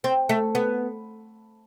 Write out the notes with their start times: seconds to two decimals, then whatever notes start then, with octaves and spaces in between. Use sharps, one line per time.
0.04 C4
0.29 A3
0.55 B3